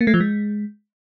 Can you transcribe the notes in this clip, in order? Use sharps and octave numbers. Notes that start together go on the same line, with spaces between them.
A#3
A3
F3
G#3